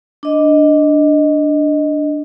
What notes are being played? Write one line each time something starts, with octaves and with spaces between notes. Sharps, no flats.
D4 D#5